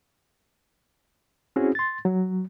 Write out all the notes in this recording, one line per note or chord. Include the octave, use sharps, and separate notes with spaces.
C4 C#4 E4 F#4 G#4
C6 A6
F#3